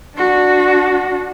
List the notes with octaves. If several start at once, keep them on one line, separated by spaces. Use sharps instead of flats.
D4 F#4